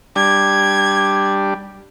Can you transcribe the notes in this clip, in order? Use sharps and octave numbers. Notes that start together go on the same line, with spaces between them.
G3 D4 G#6